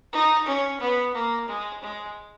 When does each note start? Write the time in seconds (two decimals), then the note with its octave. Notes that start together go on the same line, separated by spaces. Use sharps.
0.13 D#4
0.46 C#4
0.80 B3
1.14 A#3
1.48 G#3
1.83 G#3